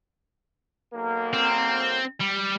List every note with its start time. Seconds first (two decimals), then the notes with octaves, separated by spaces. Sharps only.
0.94 B1 A#3
1.33 C4
2.21 G3